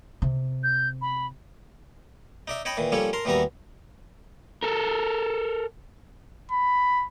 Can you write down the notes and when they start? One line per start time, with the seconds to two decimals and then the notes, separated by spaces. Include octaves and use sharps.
0.22 C3
0.64 G6
1.02 B5
2.48 D#4 D5 E5
2.65 C#5 D#5 G5 A5 B5
2.77 A#2 D#3 E3
2.92 F3 G3 A#3 C#4 A4 C#5
3.13 A#4 A5 A#5 C6
3.25 D#2 E3 G3 B3 F#4 A#5
4.63 A4 A#4
6.51 B5